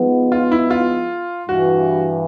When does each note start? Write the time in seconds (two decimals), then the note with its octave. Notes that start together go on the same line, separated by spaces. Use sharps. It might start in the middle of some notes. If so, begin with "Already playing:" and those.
Already playing: F3 G#3 B3 D#4
0.32 F4
0.51 E4
0.70 F4
1.49 G2 E3 F#4